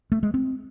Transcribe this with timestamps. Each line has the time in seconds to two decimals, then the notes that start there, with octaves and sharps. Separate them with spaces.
0.12 A3
0.23 G#3
0.34 C4